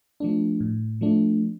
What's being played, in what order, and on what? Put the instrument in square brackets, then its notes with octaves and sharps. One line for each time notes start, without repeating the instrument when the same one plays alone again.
[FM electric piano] F3 A3 D4
A2
F3 A3 D4